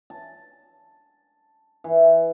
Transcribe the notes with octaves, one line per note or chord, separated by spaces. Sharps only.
A5
E3